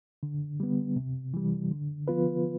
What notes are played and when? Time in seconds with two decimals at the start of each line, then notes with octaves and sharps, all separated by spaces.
0.23 D3
0.60 G3 B3
0.96 C3
1.34 E3 G3
1.71 D3
2.08 F3 B3 F4 B4